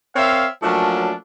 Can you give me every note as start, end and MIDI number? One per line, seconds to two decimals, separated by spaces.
0.15 0.45 60
0.15 0.45 70
0.15 0.45 73
0.15 0.45 76
0.15 0.45 77
0.62 1.12 53
0.62 1.12 54
0.62 1.12 57
0.62 1.12 58
0.62 1.12 61
0.62 1.12 62